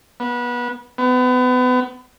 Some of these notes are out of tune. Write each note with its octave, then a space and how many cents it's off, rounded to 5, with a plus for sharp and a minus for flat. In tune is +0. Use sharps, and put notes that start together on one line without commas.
B3 -25
B3 +30